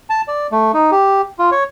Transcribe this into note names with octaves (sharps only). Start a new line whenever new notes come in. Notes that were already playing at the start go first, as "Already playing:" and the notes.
A5
D5
A3
D#4
G4
F4
C#5